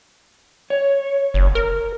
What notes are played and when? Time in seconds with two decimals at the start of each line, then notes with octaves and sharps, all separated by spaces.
0.70 C#5
1.34 F#1
1.55 A#4